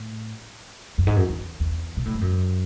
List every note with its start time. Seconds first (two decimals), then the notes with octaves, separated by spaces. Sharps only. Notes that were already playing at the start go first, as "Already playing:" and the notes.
Already playing: A2
0.98 F#2
1.07 G#2
1.16 F#2
1.29 E2
1.60 E2
1.97 B2
2.05 A2
2.14 G#2
2.21 F#2